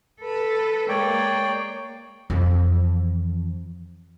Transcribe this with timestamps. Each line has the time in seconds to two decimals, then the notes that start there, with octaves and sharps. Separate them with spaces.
0.21 A4 B4
0.89 G#3 A#3 C#5 D5 G5
2.30 F2 E3